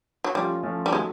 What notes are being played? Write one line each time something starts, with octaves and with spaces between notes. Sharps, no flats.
F#3
F3 G3 A3 C#4 F4
F3 A3 C#4 F4
G3
D#3 F#3 G#3 A3